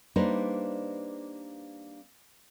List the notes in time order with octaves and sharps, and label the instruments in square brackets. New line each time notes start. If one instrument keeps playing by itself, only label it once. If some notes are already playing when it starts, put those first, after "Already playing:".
[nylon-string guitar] G3 A#3 D4 D#4 B4 C5